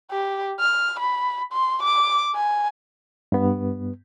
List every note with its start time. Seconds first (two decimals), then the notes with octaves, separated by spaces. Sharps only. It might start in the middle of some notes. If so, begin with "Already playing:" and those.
0.11 G4
0.60 F6
1.00 B5
1.53 C6
1.83 D6
2.35 G#5
3.32 G2 B3